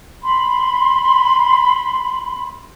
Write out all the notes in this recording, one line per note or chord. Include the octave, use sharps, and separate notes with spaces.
B5 C6